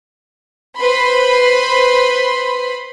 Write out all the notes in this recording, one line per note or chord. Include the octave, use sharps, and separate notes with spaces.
B4 C5 B5 C6